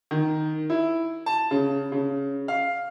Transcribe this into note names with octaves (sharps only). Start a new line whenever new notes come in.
D#3
E4
A5
C#3
C#3
F5